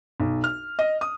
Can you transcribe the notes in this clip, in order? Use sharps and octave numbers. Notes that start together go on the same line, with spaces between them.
B1
F6
D#5
D#6